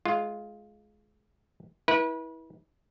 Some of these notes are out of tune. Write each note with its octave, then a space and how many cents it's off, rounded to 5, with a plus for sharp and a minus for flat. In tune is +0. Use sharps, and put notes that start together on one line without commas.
G#3 +25 F4 +0
E4 -25 B4 -35